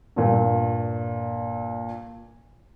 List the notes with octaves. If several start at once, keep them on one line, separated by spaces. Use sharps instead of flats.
G2 A#2